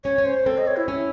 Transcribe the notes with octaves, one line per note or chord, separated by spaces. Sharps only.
C#4 C#5
C#4
C5
C4 A4
D#5
C#5
E4
C#4